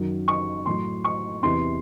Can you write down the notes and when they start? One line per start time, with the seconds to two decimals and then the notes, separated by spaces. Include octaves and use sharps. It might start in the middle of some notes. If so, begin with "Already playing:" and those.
Already playing: F#2 D#3 F#3
0.28 C#6
0.66 A2 F#3 C6
1.04 C#6
1.43 E2 C3 E3 C6